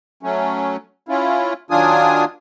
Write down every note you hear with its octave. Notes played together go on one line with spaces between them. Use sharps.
F#3 A3 C#4
C#4 E4 F4
D#3 F#3 D4 F4 G#5 D#6